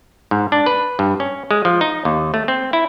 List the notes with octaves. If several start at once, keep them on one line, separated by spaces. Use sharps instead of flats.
G#2
D4
B4
G2
C#4
G#3
F3
D#4
D#2
A3
C4
E4